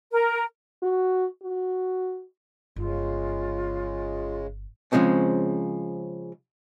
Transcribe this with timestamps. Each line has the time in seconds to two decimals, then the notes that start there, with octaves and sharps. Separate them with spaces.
0.11 A#4
0.83 F#4
1.43 F#4
2.76 G1 C#3 G#3 F4
4.92 C#3 F3 G#3 C4 C#4